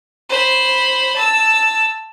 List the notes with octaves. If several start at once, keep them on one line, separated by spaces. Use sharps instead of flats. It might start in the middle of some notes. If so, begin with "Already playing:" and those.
C5 B5
A5 E6